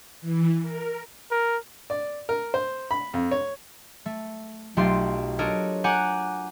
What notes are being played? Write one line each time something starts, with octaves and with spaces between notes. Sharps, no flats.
E3
A#4
A#4
D5
A#4
C5
B5
F2
C#5
A3
B1 A3 F4 G4 C6
D4 A4 A#4 C#5 D#5
F#5 G#5 A#5 D6 F#6 G6